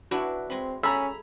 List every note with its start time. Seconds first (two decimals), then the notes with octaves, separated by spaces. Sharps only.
0.11 D4 E4 F#4 B4
0.50 G#3 C4 B5
0.83 C#4 G#4 A4 A#5 B5 E6